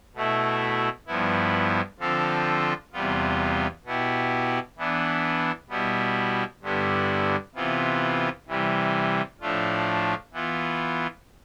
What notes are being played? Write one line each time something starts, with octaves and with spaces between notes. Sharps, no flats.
B2 A3 E4
G2 F3 B3 E4
D3 F3 C4 F4 A4
E2 C3 G3 B3 F4
B2 B3 E4 G4
E3 B3 D4
B2 G3 B3 E4
G2 D3 G3 B3 E4
C3 E3 B3 F4
C3 E3 G3
A2 F3 A3 D4 F4
E3 B3 F4